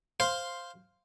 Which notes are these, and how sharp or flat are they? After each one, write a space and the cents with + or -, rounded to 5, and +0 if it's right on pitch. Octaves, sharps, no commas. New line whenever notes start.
C5 +5 F5 +0 C6 +0